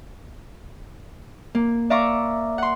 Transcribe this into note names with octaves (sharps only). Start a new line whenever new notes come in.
A#3
D5 E5 F5 A#5 C#6 D6
F#5 C6